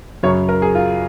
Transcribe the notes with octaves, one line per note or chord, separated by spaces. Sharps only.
F#2 C#3 F#3 C#5
A#4
G#4
F4